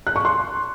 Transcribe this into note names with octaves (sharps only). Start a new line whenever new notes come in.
F#6
C#6
C6